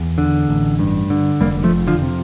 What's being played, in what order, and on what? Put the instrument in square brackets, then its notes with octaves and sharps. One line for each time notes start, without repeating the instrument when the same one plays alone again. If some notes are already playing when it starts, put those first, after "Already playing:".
Already playing: [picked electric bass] E2
D3
A1
G2
D3
F1 G3 A#3
F3 A3
F2
D3 F3
C3